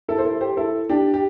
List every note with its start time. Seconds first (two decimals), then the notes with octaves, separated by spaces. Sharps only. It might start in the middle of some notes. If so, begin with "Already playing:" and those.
0.08 E4 A4
0.18 C5
0.25 E4 A4
0.41 G4 C5
0.57 E4 A4
0.89 D4 G4
1.14 G4